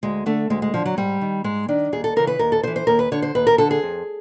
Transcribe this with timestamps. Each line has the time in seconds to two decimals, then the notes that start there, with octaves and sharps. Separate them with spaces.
0.03 D2 G#3
0.26 D3 A3
0.50 D2 G#3
0.62 G#3
0.74 D3 F3
0.86 F#3
0.97 G#2 G3
1.21 D#3
1.44 G#2 G#3
1.68 D#3 D4
1.93 D#2 G#4
2.04 A4
2.16 C#3 E3 A#4
2.27 B4
2.39 D#2 A#4
2.52 A4
2.63 C#3 C5
2.67 E3
2.76 C5
2.87 D#2 A#4
2.99 B4
3.12 D3 C#5
3.22 C5
3.35 D#2 B4
3.47 A#4
3.58 D3 A4
3.71 G#4
3.83 F2